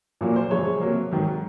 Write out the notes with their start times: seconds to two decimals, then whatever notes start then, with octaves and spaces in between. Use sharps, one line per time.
0.21 A#2 F#3 A#3 F4
0.36 C5
0.51 F#2 C#3 G#3 C#5
0.81 C3 F#3 A#3
1.11 G#2 D#3 F#3